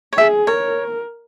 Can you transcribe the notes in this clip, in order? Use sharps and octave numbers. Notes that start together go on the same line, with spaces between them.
C#5
G#4 E5
A#4 C#5